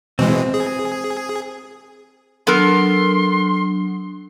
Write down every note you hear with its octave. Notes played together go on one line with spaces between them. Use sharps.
B2 E3 G#3 C4
G#4
F#3 B3 D4 A4 A#4 C6